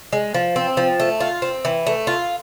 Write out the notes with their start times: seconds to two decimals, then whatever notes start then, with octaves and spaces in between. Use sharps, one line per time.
0.13 G#3
0.34 F3
0.56 C4
0.77 F3
1.00 A3
1.20 F4
1.42 C4
1.65 E3
1.86 A3
2.07 F4